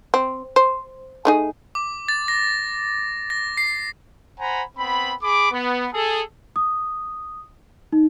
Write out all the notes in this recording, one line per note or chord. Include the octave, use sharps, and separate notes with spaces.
C4
C5
A3 D#4 G#4
D6
A6
A#6
A#6
C7
C5 F#5 G#5 A#5 B5
B3 C4 B5
G#4 B5 D6
B3
G#4 A4
D#6
D#4